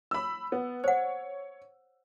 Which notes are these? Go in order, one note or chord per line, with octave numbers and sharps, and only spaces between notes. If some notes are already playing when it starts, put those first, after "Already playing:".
B5 E6
B3
C5 C#5 F#5